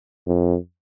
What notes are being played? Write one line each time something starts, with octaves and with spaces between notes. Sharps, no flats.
F2